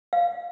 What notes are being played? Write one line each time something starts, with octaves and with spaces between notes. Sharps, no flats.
F5